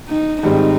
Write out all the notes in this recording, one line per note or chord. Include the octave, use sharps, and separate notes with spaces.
D#4
G#2 D#3 G3 C4 D#4